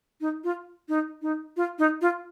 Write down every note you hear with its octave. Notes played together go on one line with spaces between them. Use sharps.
D#4
F4
D#4
D#4
F4
D#4
F4